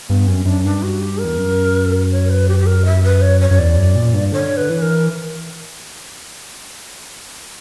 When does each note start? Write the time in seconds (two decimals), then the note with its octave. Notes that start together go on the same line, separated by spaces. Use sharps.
0.09 G2 B3
0.27 F#2 C#4
0.45 F#2 D4
0.64 G2 D4
0.83 F#4
1.01 G4
1.20 E2 A#4
1.38 F#2
2.12 C#5
2.30 B4
2.49 G4
2.59 G4
2.67 A#4
2.85 E5
3.03 B4
3.22 C#5
3.40 C#5
3.51 F#2
3.59 E2 D5
3.77 F#2
3.96 A#2
4.14 G2
4.32 D3 C#5
4.57 B4
4.70 E3
4.82 A#4